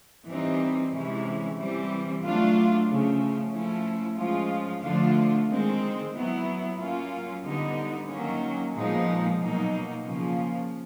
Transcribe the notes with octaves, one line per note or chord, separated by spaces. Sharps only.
E3 G3 C4 D#4
C3 E3 G#3 C#4 E4
E3 G3 C4
F#3 A3 D4 F4
C#3 F3 A3 C#4
F3 A3 C#4 E4
F3 G#3 C#4 F4
D3 F3 A3 D4 F4
D#3 G#3 C4
F#3 B3 E4
F#3 A#3 C#4 F4
D3 G3 B3 D#4
D#3 F#3 A#3 C#4
A#2 F3 G#3 B3 D#4
B2 F#3 A#3 D#4
C#3 F3 A#3 C#4 F4